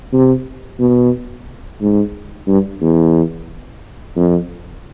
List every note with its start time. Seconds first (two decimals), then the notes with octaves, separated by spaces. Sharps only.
0.13 C3
0.80 B2
1.81 G#2
2.48 G2
2.81 E2
4.16 F2